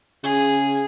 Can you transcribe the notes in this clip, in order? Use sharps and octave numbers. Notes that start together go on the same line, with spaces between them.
C#3 G#4